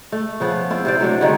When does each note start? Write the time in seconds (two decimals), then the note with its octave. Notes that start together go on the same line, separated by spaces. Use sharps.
0.12 A3
0.40 C#3 F3 B3
0.70 C4 E4 F4
0.85 C3 C5 D5
0.99 C3 F#3 A3 D4
1.21 D3 D#3 G#3